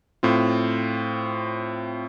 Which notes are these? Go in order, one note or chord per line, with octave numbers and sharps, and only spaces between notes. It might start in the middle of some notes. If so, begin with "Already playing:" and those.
A2 C4 F4